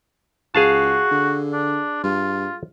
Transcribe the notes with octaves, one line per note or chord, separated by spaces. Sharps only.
C#2 F#4 G#4 F5 A5
D3
D4
G2 F4